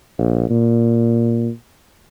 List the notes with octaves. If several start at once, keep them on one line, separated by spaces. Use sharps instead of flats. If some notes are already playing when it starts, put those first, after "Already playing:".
A#1
A#2